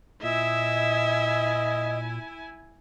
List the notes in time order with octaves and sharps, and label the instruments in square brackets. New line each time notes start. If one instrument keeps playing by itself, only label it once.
[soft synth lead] A#2 [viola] E4 G#5 [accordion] D#5 [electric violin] E5